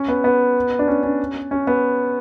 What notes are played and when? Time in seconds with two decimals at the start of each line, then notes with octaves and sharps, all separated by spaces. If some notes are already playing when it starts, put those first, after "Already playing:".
Already playing: C#4
0.08 B3
0.24 B3
0.79 D4
0.88 C#4
1.03 C#4
1.51 C#4
1.67 B3